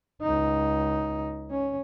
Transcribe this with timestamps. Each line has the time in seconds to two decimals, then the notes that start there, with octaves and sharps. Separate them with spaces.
0.22 C#2 D#4
1.51 C#4